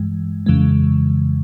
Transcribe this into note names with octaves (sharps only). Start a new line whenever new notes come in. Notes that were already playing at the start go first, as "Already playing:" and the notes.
Already playing: G2 E3 G#3
F2 C#3 E3 G#3